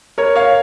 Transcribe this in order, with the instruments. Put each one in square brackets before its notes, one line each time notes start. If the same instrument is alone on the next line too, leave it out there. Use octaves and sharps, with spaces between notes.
[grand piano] A#4 C#5
C#5 F5